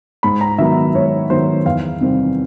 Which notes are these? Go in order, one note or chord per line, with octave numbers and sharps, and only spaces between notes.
G#2 B5
A#5
D#3 F#3 B3 E5
G#2 C#5
D#3 F#3 B3 C5
E2 F5
C3 D#3 G3 C4